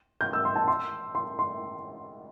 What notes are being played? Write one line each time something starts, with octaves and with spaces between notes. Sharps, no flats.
G6
E6
C6
A5
C6
C6
C6